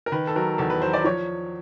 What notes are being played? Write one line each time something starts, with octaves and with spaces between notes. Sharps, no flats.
A#4
D#3 B4
A4
F#3 A#4
E2 A4
B4
F#3 C5
D5
F3 C#5